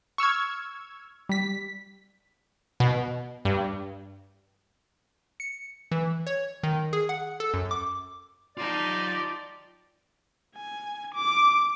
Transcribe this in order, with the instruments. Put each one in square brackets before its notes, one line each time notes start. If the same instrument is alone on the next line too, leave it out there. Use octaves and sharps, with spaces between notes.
[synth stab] C#6 E6 F6 G#6
G3 B6
[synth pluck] B2
G2
C#7
E3
C#5
D#3
G#4
F#5
A4
F#2
D6
[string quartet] D#4 G4 [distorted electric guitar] F4 A5 [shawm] D5
[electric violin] G#5
D6